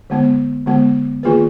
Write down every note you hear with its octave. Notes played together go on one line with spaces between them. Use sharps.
D3 G#3 B3
D3 G#3 B3
D#3 A#3 F4 G#4 B4